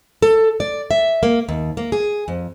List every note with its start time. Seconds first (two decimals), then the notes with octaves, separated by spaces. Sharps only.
0.22 A4
0.60 D5
0.91 E5
1.23 A#3
1.49 D#2
1.77 A#3
1.92 G#4
2.28 F2